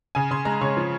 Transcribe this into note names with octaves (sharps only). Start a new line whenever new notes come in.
C#3 G#5
C#3 C6
G#3 A#5
C#3 C#5
F3